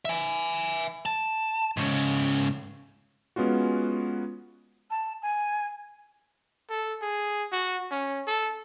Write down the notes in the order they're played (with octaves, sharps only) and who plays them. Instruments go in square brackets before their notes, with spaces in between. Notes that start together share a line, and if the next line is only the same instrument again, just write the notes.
[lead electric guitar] E5 G#5
A5
G#2 C#3
[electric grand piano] G#3 B3 C#4 F4 F#4
[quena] A5
G#5
[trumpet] A4
G#4
F#4
C#4
A4